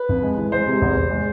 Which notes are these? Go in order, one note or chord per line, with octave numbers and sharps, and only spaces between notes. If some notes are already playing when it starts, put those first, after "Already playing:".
Already playing: B4
F2
G#3
E3
G#3 C5
C3
E2
E2
G#3